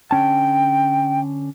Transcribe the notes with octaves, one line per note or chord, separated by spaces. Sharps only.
D3 C#4 G5 A5